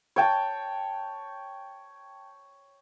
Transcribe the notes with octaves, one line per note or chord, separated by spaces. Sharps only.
C#5 G5 A5